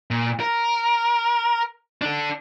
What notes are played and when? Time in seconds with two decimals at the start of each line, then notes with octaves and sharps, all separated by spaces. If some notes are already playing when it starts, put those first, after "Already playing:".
0.11 A#2
0.40 A#4
2.02 D4 A4